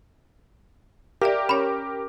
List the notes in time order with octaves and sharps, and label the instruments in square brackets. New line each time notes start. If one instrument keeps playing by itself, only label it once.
[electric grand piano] G4 A#4 [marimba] D5 E5 F5
[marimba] C#4 C#5 [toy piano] B5